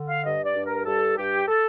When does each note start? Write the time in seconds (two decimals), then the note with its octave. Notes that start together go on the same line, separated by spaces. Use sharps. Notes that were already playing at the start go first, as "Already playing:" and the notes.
Already playing: D3
0.08 F5
0.24 G2 D#5
0.45 D5
0.55 G2
0.65 A#4
0.86 G2 A4
1.17 G2 G4
1.48 A4